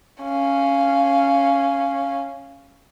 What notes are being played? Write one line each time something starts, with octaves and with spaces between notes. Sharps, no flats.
C#4 F5